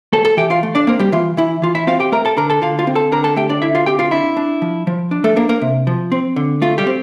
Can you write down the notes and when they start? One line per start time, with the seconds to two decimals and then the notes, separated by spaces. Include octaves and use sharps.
0.13 A3 A4 A5
0.25 A4 A5
0.37 E3 G4 G5
0.50 F4 F5
0.63 A3
0.75 D4 D5
0.87 A#3 C4 A#4
0.99 G3 G4
1.12 E3 F4
1.37 E3 E4
1.62 E3 F4
1.75 E4 E5
1.87 C4 F4 F5
2.00 G4 G5
2.12 A3 A#4 A#5
2.25 A4 A5
2.37 D3 A#4 A#5
2.50 A4 A5
2.62 D3 F4 F5
2.79 F4 F5
2.87 C4
2.95 A4 A5
3.12 D3 A#4 A#5
3.24 A4 A5
3.36 A3 G4 G5
3.49 D4 D5
3.62 D3 E4 E5
3.75 F4 F5
3.86 C4 G4 G5
3.99 F4 F5
4.11 D4 E4 E5
4.37 D4
4.62 F3
4.87 F3
5.11 D4
5.24 A3 A4
5.36 A#3 D4 A#4
5.49 A#3 A#4
5.61 C3
5.87 F3
6.12 C4
6.36 D3
6.62 A3 F4
6.78 G3 G4
6.87 C4